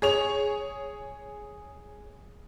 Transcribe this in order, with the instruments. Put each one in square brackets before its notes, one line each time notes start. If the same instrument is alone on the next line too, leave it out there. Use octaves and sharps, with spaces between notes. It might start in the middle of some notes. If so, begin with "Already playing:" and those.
[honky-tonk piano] G#4 C#5 F7